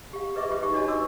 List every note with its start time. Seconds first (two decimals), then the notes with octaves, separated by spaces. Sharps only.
0.13 G4 F5
0.35 G#4 B4 D#5 E5 C#6 D6
0.50 F4 G4 C5
0.62 D#4 G4 C#6
0.74 D4 F#4 C#5 D#5 A5
0.88 F#4 B4 C#6 D6 E6